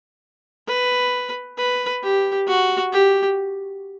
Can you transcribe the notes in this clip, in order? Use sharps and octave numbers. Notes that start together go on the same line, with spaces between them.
B4
B4
G4
F#4
G4